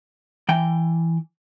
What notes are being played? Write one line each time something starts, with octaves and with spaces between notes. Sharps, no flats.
E3 G5